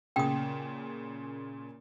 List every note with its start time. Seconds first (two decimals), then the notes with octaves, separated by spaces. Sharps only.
0.16 A#2 C#3 G5 D#6